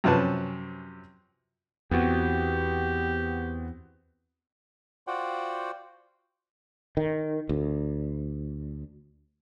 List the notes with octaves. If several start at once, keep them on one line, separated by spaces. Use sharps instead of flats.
F#2 C3 F3 C#4 B4 A5
E2 B3 C4 F#4 G4
F4 F#4 C5 D5 F#5 G5
D#3
D2